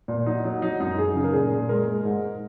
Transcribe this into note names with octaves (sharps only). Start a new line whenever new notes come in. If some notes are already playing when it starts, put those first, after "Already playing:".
A#2
F#3 D#4
F#3
F#3 D#4
F#2 D#4
F#2 G#4
C#3
A#4
A#2 G#4
A#2
G#3 A#4
G#3
G#2